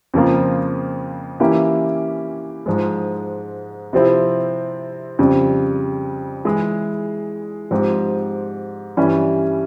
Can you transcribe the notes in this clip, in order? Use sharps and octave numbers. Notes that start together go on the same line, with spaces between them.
F2 C#3 F3 A#3 F4
E3 A#3 C#4 E4 G4
G#2 F3 G#3
C3 F3 C4 E4
F2 C#3 G3
E3 G#3 E4 G#4
G#2 F3 C4 G4
G2 E3 G3 C#4